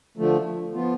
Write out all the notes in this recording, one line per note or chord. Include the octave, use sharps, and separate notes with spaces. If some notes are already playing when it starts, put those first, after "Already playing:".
D3 F3 A3
F3 B3 F4